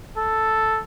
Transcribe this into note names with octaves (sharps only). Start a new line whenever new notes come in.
A4